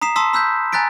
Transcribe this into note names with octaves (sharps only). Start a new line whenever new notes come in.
A#5 D#6 B6 C7 E7
A5 C6 D#6 E6 B6
B5 E6 F#6 G6 B6
G#5 A#5 F#6 A6 B6 D7